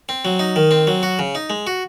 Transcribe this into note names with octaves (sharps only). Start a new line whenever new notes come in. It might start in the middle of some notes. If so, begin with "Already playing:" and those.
C4
F#3
D#4
D#3
C4
F#3
F#4
C#3
D#4
G#3
F#4